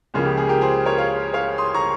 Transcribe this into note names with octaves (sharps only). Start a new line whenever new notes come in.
C#2 C#3 F3 A#3 F4 G#4
G4
G#4
G4 A#4
G#4 C5
A#4 C#5
C#5 F5
C#5 F5
C6 D#6
A#5 C#6